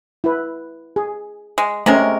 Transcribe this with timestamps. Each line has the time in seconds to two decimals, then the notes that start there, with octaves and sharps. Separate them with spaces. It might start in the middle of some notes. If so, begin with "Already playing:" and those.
0.24 E4 B4
0.96 G#4
1.58 G#3
1.86 C3 G#3 A3 C#4 A#4